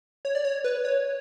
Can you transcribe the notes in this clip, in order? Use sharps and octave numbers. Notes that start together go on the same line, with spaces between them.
C#5
D5
C#5
B4
C#5